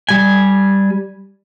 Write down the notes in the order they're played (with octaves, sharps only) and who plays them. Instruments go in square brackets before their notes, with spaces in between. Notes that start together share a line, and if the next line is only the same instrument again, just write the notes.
[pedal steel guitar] G3 G#5